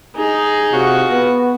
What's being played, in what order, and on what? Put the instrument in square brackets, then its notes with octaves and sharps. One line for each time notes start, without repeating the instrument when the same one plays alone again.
[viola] D#4 G#4
[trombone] C3 [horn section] F4 F#4
[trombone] B3